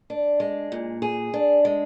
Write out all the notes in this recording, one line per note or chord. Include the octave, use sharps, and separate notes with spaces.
D4
G#3
A#2
G#4
D4
G#3